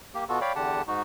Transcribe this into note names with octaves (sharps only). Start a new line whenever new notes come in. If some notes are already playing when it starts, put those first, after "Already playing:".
A#3 G4
B2 B3 F4 F#4 A4
C#5 D5 F5 G5 B5
E2 D3 G4 F#5 A5
G#2 D#4 F#4